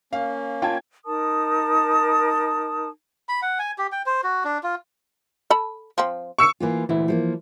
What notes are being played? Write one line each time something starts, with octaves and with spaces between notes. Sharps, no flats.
A#3 C#4 F5
F4 G5 A5 G#6
D#4 A#4 A5 D#6
B5
F#5
G#5
G4
G5
C5
F#4
D4
F4
A4 A5 B5
F3 C4
C#6 E6 C#7
E3 A#3 F4
D2 A#2 E3 E4
F3 A3 A#3